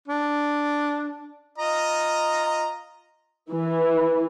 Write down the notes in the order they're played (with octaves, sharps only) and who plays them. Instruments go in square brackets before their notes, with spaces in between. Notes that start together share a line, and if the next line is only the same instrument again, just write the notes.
[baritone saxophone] D4
[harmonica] F4 D#5 A#5
[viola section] E3